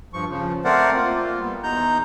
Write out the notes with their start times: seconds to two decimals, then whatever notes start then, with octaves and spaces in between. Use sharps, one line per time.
0.14 G2 F3 C#6
0.30 C#3 F3
0.65 A3 C4 A#4 C5 D5 F#5
0.96 A#3 F4
1.40 G3 B3
1.63 E2 D#4 A#5 G6